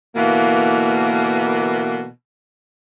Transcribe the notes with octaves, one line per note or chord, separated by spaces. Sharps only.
B2 D3 E3 A#3